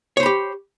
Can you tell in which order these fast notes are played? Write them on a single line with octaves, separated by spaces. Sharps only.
C#5 C5 B5 G4